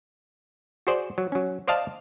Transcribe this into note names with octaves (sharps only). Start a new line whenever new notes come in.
F#4 G#4 C5 D5
F#3
F#3 C#4
C5 D5 D#5 F5 A5